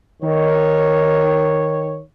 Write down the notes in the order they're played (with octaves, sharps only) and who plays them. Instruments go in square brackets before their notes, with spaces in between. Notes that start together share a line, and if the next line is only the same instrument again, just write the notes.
[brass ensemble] D#3 C#5